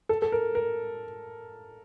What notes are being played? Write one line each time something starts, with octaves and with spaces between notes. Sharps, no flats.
A4
A4
A#4
A#4